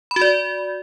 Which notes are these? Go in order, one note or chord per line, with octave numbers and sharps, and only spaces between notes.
B5
F#4
D5